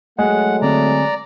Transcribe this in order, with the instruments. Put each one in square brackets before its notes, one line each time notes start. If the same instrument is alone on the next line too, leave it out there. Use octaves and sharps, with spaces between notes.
[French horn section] F#3 A3 [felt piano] G#3 [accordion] F#5
[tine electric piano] D3 C4 [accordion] D5 A#5